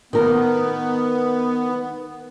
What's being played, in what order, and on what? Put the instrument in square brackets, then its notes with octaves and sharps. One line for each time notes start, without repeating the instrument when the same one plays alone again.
[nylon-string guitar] D#3 A#4 [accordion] B3